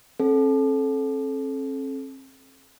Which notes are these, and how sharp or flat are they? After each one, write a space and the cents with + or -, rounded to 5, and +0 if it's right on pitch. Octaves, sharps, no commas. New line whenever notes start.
C4 +45 A4 -25